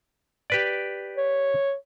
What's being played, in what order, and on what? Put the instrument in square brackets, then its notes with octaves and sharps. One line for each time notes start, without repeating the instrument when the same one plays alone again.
[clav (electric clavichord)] G4 B4 D5
[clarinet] C#5